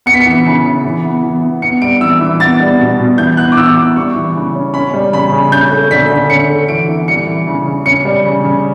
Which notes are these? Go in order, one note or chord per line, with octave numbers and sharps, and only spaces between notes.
B3 C#7
B6
C#7
E3
C#3
C#3
E3
B3
E3
B3
B3 C#7
G3 D7
E3 E6
E3
B3 A6
G3
B2
B2
E3 G6
B3 F#6
D6
E3 E6
B3 D6
G3 C#6
E3
C#3
C#4
C#4 B5
G3
C#3 B5
C#3
C#4 G6
A3
D3 B6
D3
C#4 C#7
A3
E3 D7
E3
G3 C#7
E3
C#3
C#3
C#4 C#7
G3
C#3
C#3